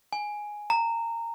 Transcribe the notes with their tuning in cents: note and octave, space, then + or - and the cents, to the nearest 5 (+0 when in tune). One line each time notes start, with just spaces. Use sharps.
G#5 +5
A#5 -20